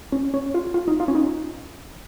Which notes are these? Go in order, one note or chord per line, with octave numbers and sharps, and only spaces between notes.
C#4
C#4
F4
F4
D#4
F4
C#4
D#4